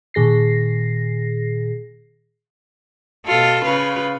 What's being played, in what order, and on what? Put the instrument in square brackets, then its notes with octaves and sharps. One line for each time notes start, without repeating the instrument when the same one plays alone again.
[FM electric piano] A#2 D#3 G#4 A#6 C7
[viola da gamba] B2 F4 A4
C#3 F4 B4